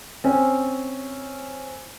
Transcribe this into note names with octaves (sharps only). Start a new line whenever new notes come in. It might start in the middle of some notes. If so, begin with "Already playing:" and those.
C4 C#4